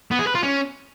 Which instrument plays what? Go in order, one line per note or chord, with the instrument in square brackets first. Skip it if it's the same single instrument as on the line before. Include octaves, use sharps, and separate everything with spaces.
[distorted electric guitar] B3
G#4
B4
F4
C#4